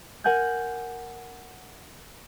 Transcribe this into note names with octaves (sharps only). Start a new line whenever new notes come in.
A#4 F#5 G#5 F#6 G6